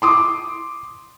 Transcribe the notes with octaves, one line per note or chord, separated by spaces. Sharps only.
C6 D6 D#6